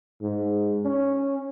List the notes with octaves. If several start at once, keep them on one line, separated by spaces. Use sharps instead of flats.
G#2
C#4